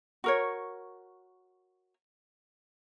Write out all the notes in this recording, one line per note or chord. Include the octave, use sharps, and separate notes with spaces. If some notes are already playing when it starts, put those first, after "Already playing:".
F#4 A#4 C#5